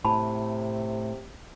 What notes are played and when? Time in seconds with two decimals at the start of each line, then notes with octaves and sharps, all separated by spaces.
0.05 A2 C3 A5 B5